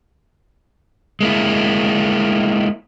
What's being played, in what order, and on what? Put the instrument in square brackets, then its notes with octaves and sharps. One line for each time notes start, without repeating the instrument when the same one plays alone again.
[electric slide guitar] G#3 A#3 E4